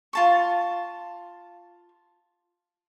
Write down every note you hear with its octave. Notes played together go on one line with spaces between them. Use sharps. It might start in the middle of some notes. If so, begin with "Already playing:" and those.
F4 A5 C#6